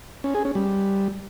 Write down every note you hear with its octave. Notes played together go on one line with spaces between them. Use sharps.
C#4
G#4
C#4
G3